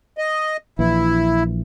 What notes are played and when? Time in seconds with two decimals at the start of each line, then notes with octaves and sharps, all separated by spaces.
0.18 D#5
0.79 A#1 E3 E4